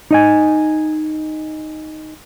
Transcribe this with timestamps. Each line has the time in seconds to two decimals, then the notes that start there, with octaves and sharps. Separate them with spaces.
0.11 D#4 D#5 G#5